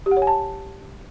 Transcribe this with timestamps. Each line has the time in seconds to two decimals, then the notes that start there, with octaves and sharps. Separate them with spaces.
0.06 G4
0.11 F#5
0.17 C#5
0.22 G#5
0.27 A5